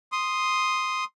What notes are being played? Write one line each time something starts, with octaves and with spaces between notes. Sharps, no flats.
C6 D#6